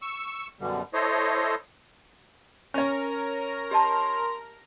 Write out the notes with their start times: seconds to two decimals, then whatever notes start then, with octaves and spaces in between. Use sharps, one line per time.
0.02 C#6 E6
0.60 F#2 B2 D3 G3
0.93 E4 A4 C5 C#5 D#5
2.74 C#4 A#4 C#5 A#5
3.71 G4 D#5 A5 C6